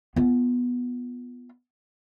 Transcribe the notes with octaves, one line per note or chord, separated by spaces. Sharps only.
B3 F4